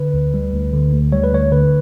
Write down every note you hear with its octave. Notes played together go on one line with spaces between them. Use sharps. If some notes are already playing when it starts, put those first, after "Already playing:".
Already playing: D3 B4
D2
G3
D2
D3
D2
G3 C#5
B4
D2 C#5
D3 B4